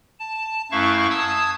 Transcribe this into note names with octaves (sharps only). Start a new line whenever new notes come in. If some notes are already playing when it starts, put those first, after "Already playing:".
A5
F#2 A3 E4 F5 C#6
A5 D#6 E6 G#6